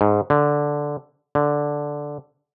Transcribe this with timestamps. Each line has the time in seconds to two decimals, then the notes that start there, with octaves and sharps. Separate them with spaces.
0.01 G#2
0.30 D3
1.35 D3